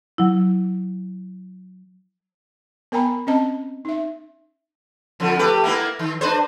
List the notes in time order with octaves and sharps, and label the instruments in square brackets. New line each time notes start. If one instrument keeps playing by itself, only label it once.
[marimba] F#3 E4
[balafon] B3 A#4 G5 G#5 A#5 B5
C4 C#4 D#5 A5
D#4 E5
[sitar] F2 D3 F3
A3 G4 B4
A#3 B3 E4
D#3
D4 B4 C5